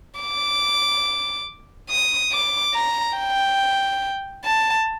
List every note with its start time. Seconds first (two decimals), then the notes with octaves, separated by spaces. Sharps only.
0.20 D6
1.90 D#6
2.32 D6
2.75 A#5
3.17 G5
4.44 A5